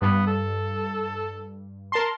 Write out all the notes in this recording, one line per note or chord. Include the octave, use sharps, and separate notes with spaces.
G2 B3
A4
A#4 A5 C6